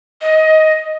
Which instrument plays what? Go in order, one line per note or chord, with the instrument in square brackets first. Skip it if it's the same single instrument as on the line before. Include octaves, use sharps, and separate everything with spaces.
[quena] D#5